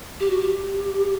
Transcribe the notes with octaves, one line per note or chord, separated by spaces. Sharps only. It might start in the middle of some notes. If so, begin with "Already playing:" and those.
G4
F#4
G4